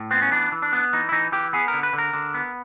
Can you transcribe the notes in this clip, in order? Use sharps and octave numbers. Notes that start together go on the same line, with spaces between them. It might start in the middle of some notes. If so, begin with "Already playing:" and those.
Already playing: A2
B3 C4
C#4
E3 D4
E3
D4
B3
E3 D#4
E4
E3 D#4
E3 G4
B3 G#4
A#4
D3
B4
D3
A#4
D3
B3